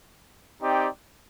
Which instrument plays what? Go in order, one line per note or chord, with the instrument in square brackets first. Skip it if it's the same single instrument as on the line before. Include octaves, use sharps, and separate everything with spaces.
[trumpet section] C4 D#4 G4 D5 G5